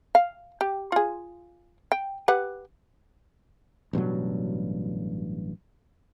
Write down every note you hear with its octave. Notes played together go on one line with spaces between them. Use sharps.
F5
G4
F4 G#4
G5
G4 B4 F#5
A1 G2 B2 F#3